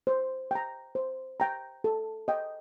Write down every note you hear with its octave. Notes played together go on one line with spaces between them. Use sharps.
C5
G5 A#5
C5
G5 A#5
A4
D#5 G5